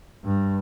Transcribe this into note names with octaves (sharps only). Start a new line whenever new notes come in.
G2